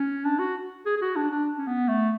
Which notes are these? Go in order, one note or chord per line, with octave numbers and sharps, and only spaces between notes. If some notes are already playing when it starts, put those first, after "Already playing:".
Already playing: C#4
D4
F#4
G#4
G#4
F#4
D4
D4
C#4
B3
A3